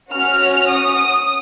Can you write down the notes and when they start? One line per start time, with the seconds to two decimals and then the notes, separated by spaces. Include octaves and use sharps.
0.12 C#4 F#4 F6
0.68 D#6